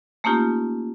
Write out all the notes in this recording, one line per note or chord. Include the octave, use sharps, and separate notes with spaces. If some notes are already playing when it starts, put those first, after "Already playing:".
A3 A#3 C#4 D#4 F4 G4